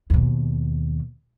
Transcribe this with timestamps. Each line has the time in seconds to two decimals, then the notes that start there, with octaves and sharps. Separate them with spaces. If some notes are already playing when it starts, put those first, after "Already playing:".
0.10 D#2 B2